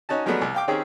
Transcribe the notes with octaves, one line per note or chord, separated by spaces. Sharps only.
C#4 D#4 F#4 A5
F3 F#3 G#3 A3 B3 D4
C2
F5 G5 D6
D#3 C4 C#4 G4 G#4